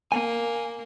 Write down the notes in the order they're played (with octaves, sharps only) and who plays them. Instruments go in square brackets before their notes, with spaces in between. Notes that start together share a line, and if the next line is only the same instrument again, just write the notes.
[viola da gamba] A#3 [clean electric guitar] G#5